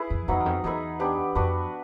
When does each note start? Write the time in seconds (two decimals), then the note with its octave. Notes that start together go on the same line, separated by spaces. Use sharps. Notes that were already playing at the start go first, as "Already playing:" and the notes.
Already playing: E4 G#4 B4
0.10 F2
0.28 F2 F#3 B3 D#4
0.40 E2
0.46 F2
0.64 E2 D#4 G#4 B4 E5
1.00 B3 D4 G4
1.35 F2 D4 F#4 B4